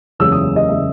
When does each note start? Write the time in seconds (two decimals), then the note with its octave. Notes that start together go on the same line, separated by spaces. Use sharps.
0.19 F#1 E2 C#3 G#3 C#4 E6
0.32 D#6
0.56 D#5
0.69 C#3 G#3 C#4 E5